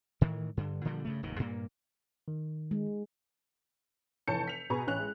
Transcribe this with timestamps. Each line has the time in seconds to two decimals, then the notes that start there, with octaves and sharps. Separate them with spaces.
0.21 A2 D#3 E3
0.57 G2 D3
0.85 A#2 D3 F3 G3
1.05 G2 C#3 A3
1.23 F1 D#2 G#2 D#3
1.39 G2 A#2 A#3
2.28 D#3
2.71 G#3
4.27 F1 E3 C#5 A5 G6 C#7
4.47 B6 F7
4.70 B2 G#4 B4 G#5 A#5 C#6
4.87 A1 C#4 F#6 F7
4.99 G#3